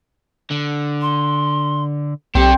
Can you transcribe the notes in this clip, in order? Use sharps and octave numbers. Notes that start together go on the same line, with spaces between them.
D3
C6
B1 C4 D4 G4 A4